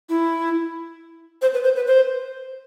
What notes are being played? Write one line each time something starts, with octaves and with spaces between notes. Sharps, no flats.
E4
C5
B4
C5
B4
C5